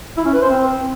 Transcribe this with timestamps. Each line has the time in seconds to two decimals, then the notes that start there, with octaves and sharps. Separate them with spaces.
0.17 E4
0.25 C#4
0.33 B4
0.42 C5
0.50 C4